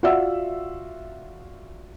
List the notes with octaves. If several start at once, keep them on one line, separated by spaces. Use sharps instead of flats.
F4 F#4 D5 E5 F#5 E6